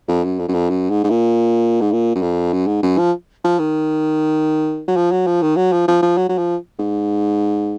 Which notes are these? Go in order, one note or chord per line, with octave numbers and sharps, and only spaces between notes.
F2
F#2
F2
F#2
F2
F#2
G#2
G#2
A#2
G#2
A#2
F#2
F2
F#2
G#2
F#2
F3
F3
D#3
F#3
F3
F#3
F3
D#3
F#3
F3
F3
F3
F#3
F#3
F3
G#2